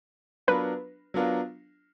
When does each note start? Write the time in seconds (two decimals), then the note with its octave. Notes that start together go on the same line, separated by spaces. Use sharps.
0.47 F#3 B3 D4 F4 A#4 B4
1.14 F#3 B3 D4 F4 A#4